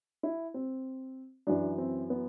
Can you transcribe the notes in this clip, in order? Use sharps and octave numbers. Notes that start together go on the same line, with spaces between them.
E4
C4
F#2 E3 D4
C4
B3